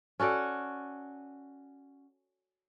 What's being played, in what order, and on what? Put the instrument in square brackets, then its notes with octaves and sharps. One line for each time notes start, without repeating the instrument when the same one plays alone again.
[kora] C#4 F#4 A4 D5